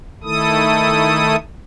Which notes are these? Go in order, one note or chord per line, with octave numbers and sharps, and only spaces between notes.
D#3 A3 E4 A4 D#6